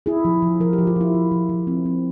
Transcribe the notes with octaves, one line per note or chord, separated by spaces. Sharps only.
E4 G#4
F3
F3
F3 A#4
G4
F3
F4
F3 E4
F3
F3
F3
C4
C4